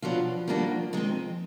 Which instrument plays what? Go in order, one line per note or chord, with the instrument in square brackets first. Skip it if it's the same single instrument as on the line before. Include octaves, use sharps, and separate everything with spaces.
[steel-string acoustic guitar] B2 F#3 B3 D4 F4 [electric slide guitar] F3
[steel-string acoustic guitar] D#3 G3 A#3 D4 F#4
D#3 G#3 C4